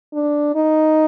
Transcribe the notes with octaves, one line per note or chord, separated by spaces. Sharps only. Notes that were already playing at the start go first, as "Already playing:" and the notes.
D4
D#4